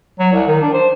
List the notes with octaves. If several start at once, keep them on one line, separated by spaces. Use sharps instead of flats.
F#3
C2
D#3
D4
C5